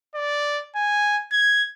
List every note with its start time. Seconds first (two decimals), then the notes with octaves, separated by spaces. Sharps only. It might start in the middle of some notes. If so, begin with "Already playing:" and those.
0.15 D5
0.76 G#5
1.32 G#6